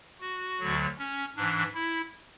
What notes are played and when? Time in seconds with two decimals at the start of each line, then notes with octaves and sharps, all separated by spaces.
0.21 F#4
0.60 D2 D3 F#3
0.98 C#4
1.36 G#2 E3 D4
1.75 E4